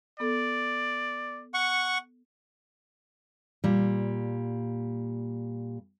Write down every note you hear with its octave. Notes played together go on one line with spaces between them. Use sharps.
B3 A4 D5
F#5 C#6
A#2 G3